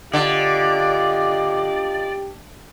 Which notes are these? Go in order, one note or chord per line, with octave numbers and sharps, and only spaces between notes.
D3 F4 G4 D5 D#5